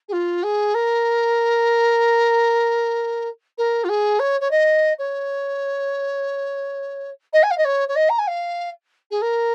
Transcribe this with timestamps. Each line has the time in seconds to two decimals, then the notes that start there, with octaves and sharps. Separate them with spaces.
0.08 G#4
0.12 F4
0.43 G#4
0.74 A#4
3.57 A#4
3.84 F4
3.88 G#4
4.19 C#5
4.40 C#5
4.50 D#5
4.98 C#5
7.33 D#5
7.42 G#5
7.50 F5
7.57 D#5
7.64 C#5
7.88 C#5
7.95 D#5
8.09 A#5
8.18 G#5
8.27 F5
9.10 G#4
9.21 A#4